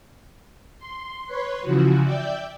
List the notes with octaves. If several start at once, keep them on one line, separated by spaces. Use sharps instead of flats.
C6
B4 C#5 C6
C#3 E3 F3 F#4
D5 E5 G5 G6